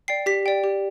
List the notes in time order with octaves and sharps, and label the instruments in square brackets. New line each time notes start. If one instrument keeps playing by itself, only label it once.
[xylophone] D5 G5 C7
G4 B6
D5 G5
G4